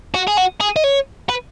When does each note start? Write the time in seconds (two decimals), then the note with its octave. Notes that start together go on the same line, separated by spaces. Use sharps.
0.15 F#4
0.28 G#4
0.38 F#4
0.61 G#4
0.76 D#5
0.84 C#5
1.30 B4